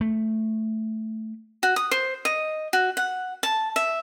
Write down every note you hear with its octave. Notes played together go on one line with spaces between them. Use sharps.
A3
F#4
D#6
C5
D#5
F#4
F#5
A5
E5